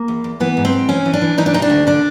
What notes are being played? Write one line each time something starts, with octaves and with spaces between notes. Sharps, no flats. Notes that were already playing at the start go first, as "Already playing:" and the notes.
Already playing: A#3
E2
E2
E3 B3
G#2
C4
G#2
E3 C#4
E3
D4
E3
E3 D#4
D4
C3 D#4
D4
D2
D3 D4